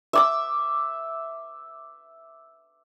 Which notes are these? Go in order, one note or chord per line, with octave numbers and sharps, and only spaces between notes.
E5 D6 E6